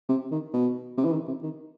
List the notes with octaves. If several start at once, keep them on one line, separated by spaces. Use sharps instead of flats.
C3
D#3
B2
C3
E3
D#3
C3
D#3